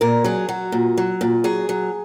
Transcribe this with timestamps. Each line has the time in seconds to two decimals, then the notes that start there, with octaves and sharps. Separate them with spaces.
0.01 A#2 A#4
0.24 F#3 G#4
0.49 F#3 F#4
0.72 A#2
0.98 F#3
1.21 A#2
1.44 F#3 G#4
1.69 F#3